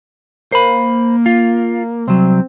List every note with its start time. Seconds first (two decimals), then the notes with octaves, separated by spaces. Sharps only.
0.52 A#3 C5 B5
1.26 F4
2.07 C2 F#3 C4